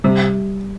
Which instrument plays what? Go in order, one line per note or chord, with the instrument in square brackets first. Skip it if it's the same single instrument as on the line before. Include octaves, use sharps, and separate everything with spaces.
[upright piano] C3 [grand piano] G3